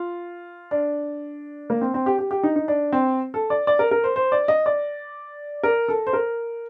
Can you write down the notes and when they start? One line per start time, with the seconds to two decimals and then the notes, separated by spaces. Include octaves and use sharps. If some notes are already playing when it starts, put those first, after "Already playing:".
Already playing: F4
0.71 D4
1.70 A#3
1.81 C4
1.94 C4
2.06 G4
2.19 G4
2.31 G4
2.43 D#4
2.56 D#4
2.68 D4
2.92 C4
3.34 A4
3.50 D5
3.67 D5
3.79 A#4
3.91 A#4
4.04 C5
4.16 C5
4.32 D5
4.48 D#5
4.66 D5
5.63 A#4
5.88 A4
6.07 C5
6.13 A#4